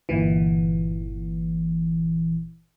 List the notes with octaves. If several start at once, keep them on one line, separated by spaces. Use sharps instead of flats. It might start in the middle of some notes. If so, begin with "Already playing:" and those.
G1 A#2 E3